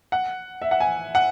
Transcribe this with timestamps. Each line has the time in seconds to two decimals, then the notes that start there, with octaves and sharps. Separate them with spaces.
0.12 F#5
0.62 E5
0.71 F#5
0.80 G#5
1.15 F#5